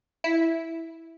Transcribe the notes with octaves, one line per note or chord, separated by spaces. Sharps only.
E4